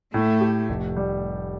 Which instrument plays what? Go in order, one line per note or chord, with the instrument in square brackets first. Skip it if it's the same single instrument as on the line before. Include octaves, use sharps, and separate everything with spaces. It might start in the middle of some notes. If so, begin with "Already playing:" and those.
[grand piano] A2 [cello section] A3
[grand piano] G4
F1
G3